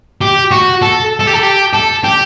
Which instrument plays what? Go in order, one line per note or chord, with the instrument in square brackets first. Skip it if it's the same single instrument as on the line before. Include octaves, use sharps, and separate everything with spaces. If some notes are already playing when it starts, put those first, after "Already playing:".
[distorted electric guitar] G4
F#4
A4
A4
G4
A4
G4
A4
G4